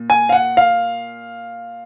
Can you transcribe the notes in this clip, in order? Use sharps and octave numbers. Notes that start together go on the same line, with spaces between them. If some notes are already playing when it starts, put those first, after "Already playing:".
Already playing: A#2
G#5
F5
F#5
F5